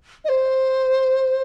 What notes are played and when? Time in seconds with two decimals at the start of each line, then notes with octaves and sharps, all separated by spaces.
0.24 D#5
0.29 C5